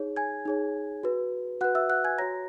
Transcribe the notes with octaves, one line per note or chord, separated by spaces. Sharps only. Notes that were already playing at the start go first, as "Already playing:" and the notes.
Already playing: D#4 G#4 C#5
G#5 G#6
D#4 G#4 C#5
F#4 B4
F#4 B4 F#5 F#6
E5 E6
F#5 F#6
G#5 G#6
F#4 C#5 A#5 A#6